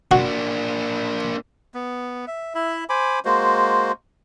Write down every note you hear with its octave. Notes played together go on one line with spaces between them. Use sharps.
A#3 D4 F#4
B3
E5
E4 E5
C5 G#5 B5 D6
G#3 A#3 F#4 C5